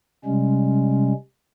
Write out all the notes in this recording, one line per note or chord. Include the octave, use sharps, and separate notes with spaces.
C3 G3 G#3 C#4